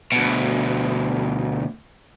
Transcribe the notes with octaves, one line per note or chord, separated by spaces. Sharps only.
D2 B2